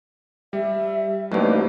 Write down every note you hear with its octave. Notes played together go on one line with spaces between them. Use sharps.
G3 E5
A1 G2 F#3 A3 A#3 D#4 C5